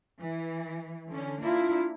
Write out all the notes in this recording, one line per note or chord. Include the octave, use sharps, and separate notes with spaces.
E3
D3 C#4
A#3 D4 E4 F4